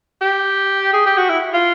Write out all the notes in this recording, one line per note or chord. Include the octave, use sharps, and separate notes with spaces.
G4
G#4
G4
F#4
E4
F4